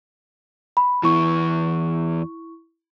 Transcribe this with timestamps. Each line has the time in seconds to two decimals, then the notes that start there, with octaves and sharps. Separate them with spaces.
0.77 B5
1.03 E2 E3 E4 C#6